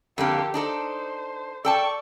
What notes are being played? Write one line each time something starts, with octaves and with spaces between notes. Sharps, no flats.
F2 D3 A#3 G4 A4
D4 D#4 A4 C5
A4 D5 G5 A5 C#6